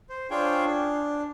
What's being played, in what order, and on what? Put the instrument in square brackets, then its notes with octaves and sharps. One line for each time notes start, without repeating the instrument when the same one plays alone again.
[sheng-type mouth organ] C5
D4 F4 G#4 C5 C#5 G5
D4